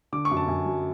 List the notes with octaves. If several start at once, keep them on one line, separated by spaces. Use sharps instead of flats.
D3 D6
C#6
F#2
A5
F#2 G#5
F#3